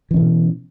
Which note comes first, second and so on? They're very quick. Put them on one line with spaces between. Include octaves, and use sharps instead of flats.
E3 C#4 B2